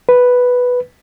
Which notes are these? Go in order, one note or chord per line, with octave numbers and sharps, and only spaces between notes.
B4